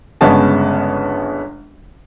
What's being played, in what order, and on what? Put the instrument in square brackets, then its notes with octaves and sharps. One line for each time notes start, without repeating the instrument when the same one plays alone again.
[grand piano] G1 C#3 G#3 B3 C#4 A5